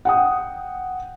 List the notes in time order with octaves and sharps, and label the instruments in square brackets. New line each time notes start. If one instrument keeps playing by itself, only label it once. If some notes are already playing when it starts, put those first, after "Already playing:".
[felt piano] F#5 G5 D#6